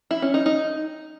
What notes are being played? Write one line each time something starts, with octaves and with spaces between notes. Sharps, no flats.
E4
C#4
D#4
D#4